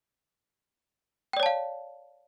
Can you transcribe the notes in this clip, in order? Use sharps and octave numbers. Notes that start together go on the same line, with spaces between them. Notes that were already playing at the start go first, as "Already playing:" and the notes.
C#5 D5 F5 G5 A5